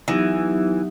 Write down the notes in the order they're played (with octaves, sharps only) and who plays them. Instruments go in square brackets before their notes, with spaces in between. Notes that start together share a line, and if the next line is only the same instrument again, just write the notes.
[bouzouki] E3 [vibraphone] F#3 B3 D#4 G4